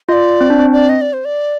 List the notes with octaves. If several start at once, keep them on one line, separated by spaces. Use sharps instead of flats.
F4 D#5
D5
C4
D4
C4
D5
D#5
D5
C5
D5